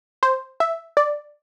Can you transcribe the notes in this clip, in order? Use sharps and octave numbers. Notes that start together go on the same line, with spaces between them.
C5
E5
D5